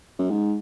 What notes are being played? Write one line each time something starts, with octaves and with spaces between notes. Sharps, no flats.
F#2
G#2